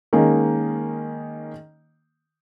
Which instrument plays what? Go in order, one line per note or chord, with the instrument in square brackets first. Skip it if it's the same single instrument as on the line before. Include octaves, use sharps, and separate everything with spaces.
[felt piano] D#3 G#3 A#3 C#4 D#5